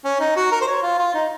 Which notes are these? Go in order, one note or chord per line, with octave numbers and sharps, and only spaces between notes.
C#4
D#4
F#4
A#4
C5
C#5
F4
F4
D#4